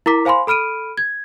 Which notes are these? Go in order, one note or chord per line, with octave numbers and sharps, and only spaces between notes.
E4 A#4 A#5 D6 B6
C5 F5 G#5 B5 C6
A4 B5 F6 D7 D#7
G#6